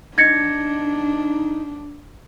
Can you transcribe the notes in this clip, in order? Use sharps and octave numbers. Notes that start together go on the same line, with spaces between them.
D4 D#4 G#6 A#6 C#7